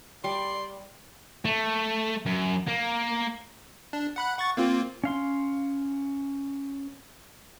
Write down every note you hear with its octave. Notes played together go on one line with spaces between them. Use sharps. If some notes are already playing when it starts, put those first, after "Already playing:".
G3 D5 C6
A3
F#2
A#3
D4
F#5 B5 F#6
F#5 C#6 A6
A#3 C4 F4
C#4 F5 C6